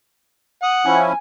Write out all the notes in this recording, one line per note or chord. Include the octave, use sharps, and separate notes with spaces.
F#5 D#6
F3 C#4 E4 G#5